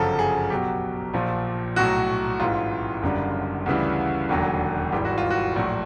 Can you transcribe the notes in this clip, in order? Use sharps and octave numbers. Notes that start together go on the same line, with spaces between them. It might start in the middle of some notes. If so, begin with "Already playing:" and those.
Already playing: G1 F#2 C#3 F3 A4
G#4
B1 B2 F#3 G4
A#1 A#2 F3
B1 A2 F#3 F#4
A1 G#2 E3 F4
F#1 F#2 D3 G3
D2 C#3 E3 G3
E1 D#2 D3 F#3
G#1 G#2 E3 G3 G4
F#4
F4
F#4
A#1 A2 F#3